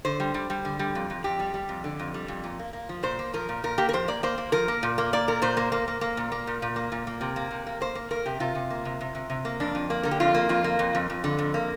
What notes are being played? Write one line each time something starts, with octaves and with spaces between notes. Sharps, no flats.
D3 C5
G3
G3
G3
D3
G3
F2
F2
F2 G4
G3
G3
F2
D3
F2
G3
F2
A#2
A#3
A#3
F3
A#2 C5
A#3
F3 A#4
A#2
A#2 A#4
A#3 G4
A#4
F3 C5
A#3 D5
A#3 C5
A#3
F3 A#4
A#3
A#2
A#3
A#3 D5
A#2 A#4
A#2 C5
A#3
A#3
A#3
A#3
A#2
A#3
A#2
A#2
A#3
A#2
A#3
C3
A#3
C3
A#3
A#3 C5
A#3
A#3 A#4
C3 G4
C3 F4
C3
A#3
C3
C3
C3
C3
A#3
F2 D4
F2
A#3 D4
D3 A#4
G4
F2 F4
A#3
F2 F4
A#3
F2
F2
F2
D3
F2
A#3